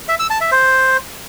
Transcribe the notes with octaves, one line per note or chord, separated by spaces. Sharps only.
E5
E6
A5
E5
C5